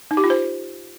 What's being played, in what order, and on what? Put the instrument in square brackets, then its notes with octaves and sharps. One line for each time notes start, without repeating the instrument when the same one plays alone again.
[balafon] D#4
G4
F4
C5